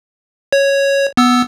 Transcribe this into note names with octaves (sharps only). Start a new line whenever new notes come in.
C#5
B3 E6